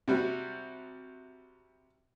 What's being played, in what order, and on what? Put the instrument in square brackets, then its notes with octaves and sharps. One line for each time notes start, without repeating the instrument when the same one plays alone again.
[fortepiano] C3 G3 F#4